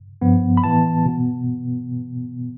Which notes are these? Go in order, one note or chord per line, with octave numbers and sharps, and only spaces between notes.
G2 F3 B3
B5
A2 E3 B3 A5
B2 B3